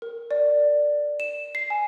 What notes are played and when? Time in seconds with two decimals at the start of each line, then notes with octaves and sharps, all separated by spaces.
0.02 A#4
0.31 D5
1.20 E7
1.55 C7
1.70 G#5